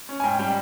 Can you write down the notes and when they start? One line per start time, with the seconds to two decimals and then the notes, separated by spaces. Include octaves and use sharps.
0.09 C#4
0.20 G#5
0.24 G#2 G5
0.39 G3 G5